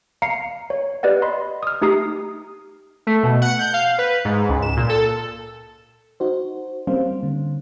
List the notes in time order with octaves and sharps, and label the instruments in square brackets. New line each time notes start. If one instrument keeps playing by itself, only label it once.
[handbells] F5 A#5 C7 C#7
C#5
G4 B4 D5 D#5 F#5
D#5 B5 C6
D#6 F6
A3 D#4 G4 A#5 D#6 C7
[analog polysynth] A3
B2
F#5
G6
F5
B4
G#2
C#2
E7
A#2
A4
[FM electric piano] D#4 F#4 C5
G3 A#3 C4 C#4 C5 F5
D3